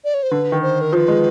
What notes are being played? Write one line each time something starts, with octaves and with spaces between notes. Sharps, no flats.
D5
C#5
C5
D3 B4
D#3
C5
A#4
F3 C5
B4
G#3